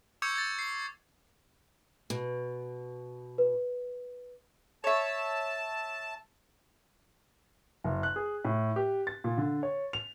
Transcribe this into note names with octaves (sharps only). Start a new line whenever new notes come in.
C#6 D6 E6 G6 G#6 C#7
G#6 A6
C7
B2
B4
C#5 E5 A5
F#1
F#6
G#4
A2
G4
A6
A#2
D3
C#5
F7